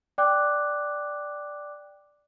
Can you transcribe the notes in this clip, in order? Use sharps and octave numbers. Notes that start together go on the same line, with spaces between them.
D5 G5 D6 F#6